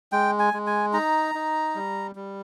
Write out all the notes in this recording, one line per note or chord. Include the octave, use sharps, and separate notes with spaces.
G#3 G5
G#5
G#3
G#5
D#4 A#5
D#4
G3
G3